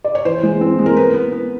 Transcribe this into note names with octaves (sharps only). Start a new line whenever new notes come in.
D5
C#5
E3 C5
G#3
C4
G#3
A#4
B3 B4
B3
B3